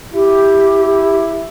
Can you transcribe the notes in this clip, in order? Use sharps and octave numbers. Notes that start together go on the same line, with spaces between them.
E4 G4